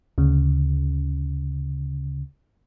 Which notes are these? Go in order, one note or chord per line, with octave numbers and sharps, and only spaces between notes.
D2 C#3